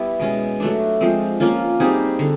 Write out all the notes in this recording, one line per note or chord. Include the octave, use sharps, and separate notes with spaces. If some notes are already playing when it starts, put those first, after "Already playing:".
Already playing: G3 B3 E4
B2 G#3 C#4
F#3 A3 D4
F3 G#3 C4
A#3 C#4 F4
G3 C4 D#4 G#4
D3